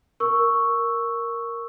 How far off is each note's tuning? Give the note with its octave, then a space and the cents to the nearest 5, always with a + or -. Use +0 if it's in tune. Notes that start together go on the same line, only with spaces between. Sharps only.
A#4 +0 C#6 +0 E6 +0